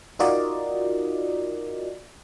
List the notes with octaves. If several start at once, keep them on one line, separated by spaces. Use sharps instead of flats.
D#4 F4 F#4 A#4 D5 D#5